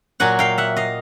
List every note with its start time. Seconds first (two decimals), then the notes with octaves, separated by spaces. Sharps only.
0.20 A#2 F#3 F#5 G#5
0.39 F5 G5
0.58 E5 F#5
0.76 D#5 F5